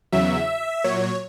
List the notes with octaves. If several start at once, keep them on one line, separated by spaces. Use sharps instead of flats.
E2 C#3 F#3 E5
A#2 F#3 C#5